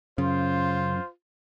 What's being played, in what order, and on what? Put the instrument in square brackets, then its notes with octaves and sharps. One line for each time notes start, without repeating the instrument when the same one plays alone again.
[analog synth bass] F#2 [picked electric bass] C#3 [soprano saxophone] F4 [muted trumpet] C5